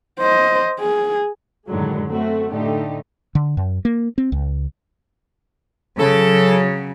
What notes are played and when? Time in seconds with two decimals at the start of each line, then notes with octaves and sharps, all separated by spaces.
0.20 C5 D#5
0.80 G#4
1.67 F#2 A2 D3 D#3 F#3 G#3
2.08 A3 C4 F#4
2.49 A2 D3 A3 D#4 G4
3.35 D3
3.57 F#2
3.85 A#3
4.18 C4
4.32 C#2
6.00 C#3 F#3 A4